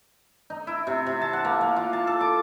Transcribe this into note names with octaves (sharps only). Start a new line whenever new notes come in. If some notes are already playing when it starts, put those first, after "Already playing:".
D#4
E4
C3
C3
A5
F#5
A#3
A#3
F4
A5
A4
D6